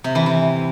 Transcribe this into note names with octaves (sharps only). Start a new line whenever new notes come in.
C3
E3
E3